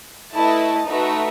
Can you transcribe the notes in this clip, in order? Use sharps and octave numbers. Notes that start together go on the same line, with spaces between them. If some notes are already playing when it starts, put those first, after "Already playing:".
A3 E4 B4 D#5 A5
A3 D#4 F#4 B4 E5